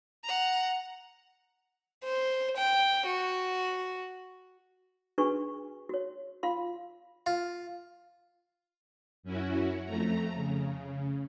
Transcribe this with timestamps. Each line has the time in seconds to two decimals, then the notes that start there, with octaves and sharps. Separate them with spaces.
0.24 F#5 A#5
2.04 C5
2.57 G5
3.06 F#4
5.18 D4 F#4 G#4 B4 G#5 C#6
5.89 F#4 C#5
6.43 F4 F5 C6
7.26 F4
9.23 F#2 C#4 E4 F#4
9.84 F2 A3 A#5
10.35 C#3